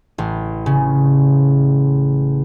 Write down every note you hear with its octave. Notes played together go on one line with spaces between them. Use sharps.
A1
C#3